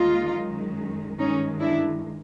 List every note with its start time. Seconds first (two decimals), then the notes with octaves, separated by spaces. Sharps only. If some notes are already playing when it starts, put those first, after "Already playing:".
Already playing: D#2 D#3 G#3 D#4 F4
0.35 F#2 D#3 G#3
1.18 G2 D#3 G#3 C#4 D#4
1.60 D4 E4